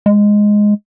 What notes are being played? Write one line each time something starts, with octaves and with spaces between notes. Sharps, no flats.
G#3